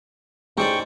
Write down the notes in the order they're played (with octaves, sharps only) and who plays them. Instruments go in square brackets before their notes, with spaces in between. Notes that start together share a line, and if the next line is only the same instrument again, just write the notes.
[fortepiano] A1 [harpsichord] D#4 C5 D5 [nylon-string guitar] G#4 [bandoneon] G5 C#6